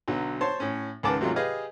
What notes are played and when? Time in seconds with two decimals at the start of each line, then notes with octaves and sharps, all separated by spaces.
0.08 B1 D3 F#3
0.41 C5 C#5 A5 C6
0.60 A2 C#4
1.03 C#2 G#2 D#3 B4 A5 D6
1.20 G#2 C3 D#3 F#3 A3 F4
1.36 G4 G#4 B4 D#5 F5 G#5